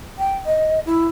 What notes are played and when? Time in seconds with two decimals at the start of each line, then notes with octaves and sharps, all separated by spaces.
0.19 G5
0.46 D#5
0.86 E4